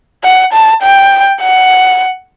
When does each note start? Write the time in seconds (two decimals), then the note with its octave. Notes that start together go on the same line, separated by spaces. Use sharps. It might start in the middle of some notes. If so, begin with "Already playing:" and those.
0.24 F#5
0.53 A5
0.83 G5
1.41 F#5